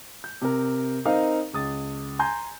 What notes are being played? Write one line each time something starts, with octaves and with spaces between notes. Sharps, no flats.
G6
C3 A#4
C4 D#4 A#4 D#5 F5
C#2 D#6 A6
G#5 A#5 C6 G6